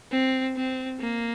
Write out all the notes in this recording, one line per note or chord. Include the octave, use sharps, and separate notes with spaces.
C4
C4
A#3